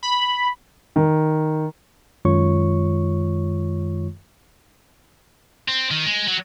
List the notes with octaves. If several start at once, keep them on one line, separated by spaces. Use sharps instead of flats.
B5
D#3
F#2 D#3 G#3 F4 C#5 C#6
C4
D#3
G#3
F#3